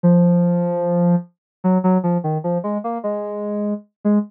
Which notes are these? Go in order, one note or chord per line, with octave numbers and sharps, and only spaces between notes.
F3
F#3
F#3
F3
D#3
F3
G#3
A#3
G#3
G#3